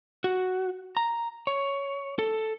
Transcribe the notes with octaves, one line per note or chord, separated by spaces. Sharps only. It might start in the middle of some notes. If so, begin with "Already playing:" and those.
F#4
A#5
C#5
A4